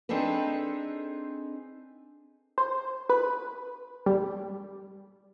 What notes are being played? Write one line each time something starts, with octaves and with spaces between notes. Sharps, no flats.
C4 D4 D#4 G#4 A4 B4
C5
B4
G3